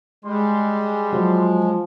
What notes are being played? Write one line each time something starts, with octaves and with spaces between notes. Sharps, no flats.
G3 G#3 C6
F3 F#3